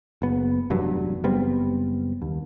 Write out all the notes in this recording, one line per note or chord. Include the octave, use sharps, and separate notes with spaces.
F#1 B3
F1 E2 G2 F#3
F#1 G3 B3 C4
D#2